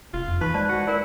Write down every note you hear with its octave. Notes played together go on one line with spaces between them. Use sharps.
F1 F4
F2
E3 D#4 B4 C6 C#6
G#3 C5 D5 A5
F#4
E4 A#4 D5